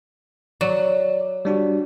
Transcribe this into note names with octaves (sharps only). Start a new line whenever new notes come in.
F#3 D5
G3 D4 F#4